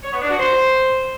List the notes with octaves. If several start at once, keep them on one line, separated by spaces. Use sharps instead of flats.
C#5
B3
D4
F#4
C5